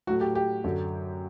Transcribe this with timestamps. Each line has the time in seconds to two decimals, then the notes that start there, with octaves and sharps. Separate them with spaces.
0.07 A2 F#3 A3 F#4
0.21 G4
0.35 G4
0.64 F#2 D3 F#3